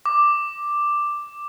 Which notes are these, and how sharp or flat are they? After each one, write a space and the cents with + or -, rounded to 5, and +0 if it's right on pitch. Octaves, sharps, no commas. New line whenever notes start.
D6 +5